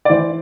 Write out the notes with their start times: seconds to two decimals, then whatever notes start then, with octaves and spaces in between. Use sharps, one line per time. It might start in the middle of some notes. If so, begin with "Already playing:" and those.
0.05 D5
0.10 E3 C5